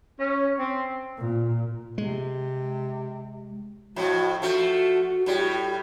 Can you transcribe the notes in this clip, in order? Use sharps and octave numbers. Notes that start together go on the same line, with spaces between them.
C#4
C4
A#2
C3 G#3
F2 A2 F#4
F3 A3 F#4
A2 G3